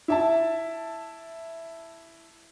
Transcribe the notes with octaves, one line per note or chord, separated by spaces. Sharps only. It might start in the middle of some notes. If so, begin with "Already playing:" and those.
E4 E5 A5